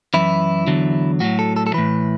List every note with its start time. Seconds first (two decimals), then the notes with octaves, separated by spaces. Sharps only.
0.14 F#2 E3 E4
0.67 E2 D3 F#3
1.20 A2 F#3 F#4
1.39 A4
1.56 A4
1.67 A4
1.74 A2 E3 B4